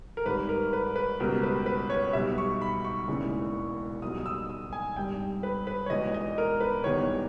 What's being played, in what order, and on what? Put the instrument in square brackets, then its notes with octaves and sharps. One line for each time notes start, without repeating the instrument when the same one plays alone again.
[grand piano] A#4
G#1 G#2 G3 B4
A#4
B4
B4
C#2 B2 G3 A#4
B4
B4
C#5
B1 B2 G3 E5
C#6
B5
C#6
E1 D#2 C#3 E3 G#3
B1 B2 G3 D#6
D#6
E6
D#6
G#5
G#1 G2 G3 G5
B4
B4
C#5
E1 E2 B2 G#3 D#5
D#5
A#4
B4
E1 E2 D#3 G3 C#5